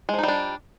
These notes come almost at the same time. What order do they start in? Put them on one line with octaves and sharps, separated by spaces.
G#3 F3 D#4 G3 D4